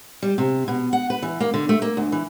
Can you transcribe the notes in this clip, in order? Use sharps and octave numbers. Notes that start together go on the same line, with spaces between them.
G3
C3
B2
F#5
B4
E3
A#3
D3
A3
A#3
D2
E3